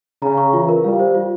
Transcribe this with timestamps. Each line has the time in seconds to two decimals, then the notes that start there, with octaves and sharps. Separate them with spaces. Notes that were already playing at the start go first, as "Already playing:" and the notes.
0.22 C#3 A#5
0.38 C#6
0.53 E3 F4
0.69 A#4
0.84 G3 F5
1.00 C5
1.15 F4